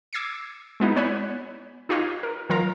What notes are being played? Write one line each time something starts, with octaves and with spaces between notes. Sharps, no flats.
D6 E6 G#6 A#6 C7 C#7
G#3 B3 D#4 E4
B3 C#5 D5 G#5 B5 F#6
D#4 F4 G4 C#5 D#5 F5
A#4
D#3 F#3 F4 A#4 F5 A#5